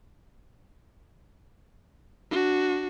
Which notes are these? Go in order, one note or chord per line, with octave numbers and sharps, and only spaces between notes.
D4 F#4